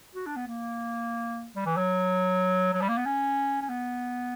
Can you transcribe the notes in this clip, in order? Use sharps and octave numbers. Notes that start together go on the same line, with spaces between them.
F#4
D4
B3
A#3
G3
E3
F#3
F#3
G3
A#3
B3
C#4
C#4
B3